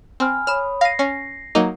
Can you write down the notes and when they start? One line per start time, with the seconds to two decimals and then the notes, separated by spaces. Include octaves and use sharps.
0.20 C4 G#5 B5 F6
0.47 C#5 B5 D#6 F6 E7
0.81 F5 A#6 C7 D#7
0.99 C#4
1.55 F#3 A#3 D#4